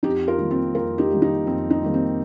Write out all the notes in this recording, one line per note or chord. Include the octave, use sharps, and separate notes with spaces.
F2 D#4 G4
F4 A#4
D#3 G3 A#3
C4 F4
F2 F4 A#4
D#4 G4
D#3 G3 A#3
D#4
F2 C4
D#4
D#3 G3 A#3
C4